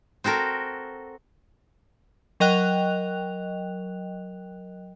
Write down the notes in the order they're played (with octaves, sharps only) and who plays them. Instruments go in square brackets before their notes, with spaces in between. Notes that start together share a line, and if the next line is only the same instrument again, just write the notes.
[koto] C4 F#4 A4 A#4
[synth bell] F#3 A#4 D#5 G5 F#6 F7